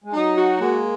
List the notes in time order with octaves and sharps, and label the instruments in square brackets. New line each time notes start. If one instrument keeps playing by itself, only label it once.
[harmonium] G#3
[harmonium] F#3 [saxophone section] D#4
[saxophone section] F#4
[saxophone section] G#3 [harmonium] A#3